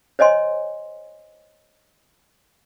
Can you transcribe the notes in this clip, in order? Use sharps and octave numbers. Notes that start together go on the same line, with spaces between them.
C5 C#5 D#5 G#5 C6